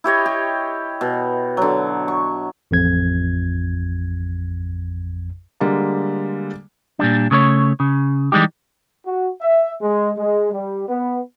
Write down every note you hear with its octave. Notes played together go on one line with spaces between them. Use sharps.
E4 G4 C#5 D#5
G4
B2
D3 F#3
C#6
A1 F2 G#6
D3 G3 G#3 A#3
A#2 G3 D4
C#3 A3 A#4 C#5
C#3
E3 G3 G#3 D#4 G4
F#4
E5
G#3
G#3
G3
B3